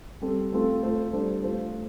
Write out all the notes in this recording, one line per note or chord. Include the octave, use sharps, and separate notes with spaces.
G3 C4 A4
A3 C4 F4 A4
A3 F4 A4 C5
G3 D4 A4 C5
A3 F4 A4 C5